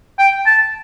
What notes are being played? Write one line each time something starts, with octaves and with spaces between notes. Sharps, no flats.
G5
A5